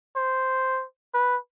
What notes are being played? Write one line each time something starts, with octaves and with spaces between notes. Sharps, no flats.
C5
B4